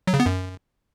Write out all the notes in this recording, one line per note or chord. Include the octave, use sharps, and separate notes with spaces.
F#3
C#3
B3
F#2